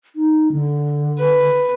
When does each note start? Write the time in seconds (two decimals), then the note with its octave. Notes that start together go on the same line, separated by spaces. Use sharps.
0.16 D#4
0.52 D3
1.18 B4